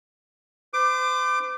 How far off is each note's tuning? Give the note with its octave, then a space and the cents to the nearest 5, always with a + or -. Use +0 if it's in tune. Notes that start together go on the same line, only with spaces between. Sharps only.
C5 -40 D6 +20